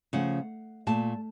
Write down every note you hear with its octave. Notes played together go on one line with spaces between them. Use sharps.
C#3 F3 A3 F#5
A#2 A3 A5